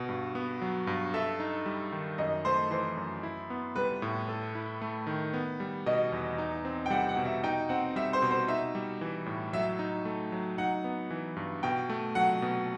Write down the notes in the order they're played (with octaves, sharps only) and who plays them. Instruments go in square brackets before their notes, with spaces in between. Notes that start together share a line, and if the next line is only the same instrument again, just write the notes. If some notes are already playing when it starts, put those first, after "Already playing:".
Already playing: [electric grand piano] B2
G2
B3
F#3
G2
[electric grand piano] A4 [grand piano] E5
[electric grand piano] D#4
G3
D#3
[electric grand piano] F#2 [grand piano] D#5
[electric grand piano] A3 [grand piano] C5
[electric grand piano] E3 [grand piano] C5
[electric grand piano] F#2
E4
B3
[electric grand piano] G3 [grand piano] B4
[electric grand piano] A2
A4
E4
A3
D#3
B3
G3
[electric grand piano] B2 [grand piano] D#5
[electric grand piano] E2
D#4
C4
[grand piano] G5
[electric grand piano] G3 [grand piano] F#5
[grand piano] F#5
[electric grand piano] B2
[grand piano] E5
[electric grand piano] D#4 [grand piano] G5
[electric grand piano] C4 [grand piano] F#5
[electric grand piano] G3 [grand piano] E5
[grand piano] C5
[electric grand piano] B2
[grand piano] C5
[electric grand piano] D#4 [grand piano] E5
[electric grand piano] G3
E3
A2
[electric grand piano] F#3 [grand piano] E5
[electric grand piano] D#4
A3
F#3
[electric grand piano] D#4 [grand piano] F#5
[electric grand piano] B3
E3
G2
[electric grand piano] B2 [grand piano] G5
[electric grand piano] A3
[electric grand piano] F#3 [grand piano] F#5
[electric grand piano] B2